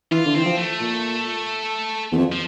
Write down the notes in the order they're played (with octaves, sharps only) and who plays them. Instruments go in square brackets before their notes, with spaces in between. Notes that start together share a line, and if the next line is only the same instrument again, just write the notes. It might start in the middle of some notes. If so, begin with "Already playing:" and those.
[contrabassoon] E3 [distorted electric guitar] F4
[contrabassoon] D3
[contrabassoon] E3 [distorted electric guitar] C4
[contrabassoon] F3
[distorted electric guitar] A3
[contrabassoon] A#2
E2
F2
[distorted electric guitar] F3